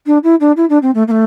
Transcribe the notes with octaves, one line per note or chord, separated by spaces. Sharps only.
D4
E4
D4
E4
D4
C4
A3
A#3
A3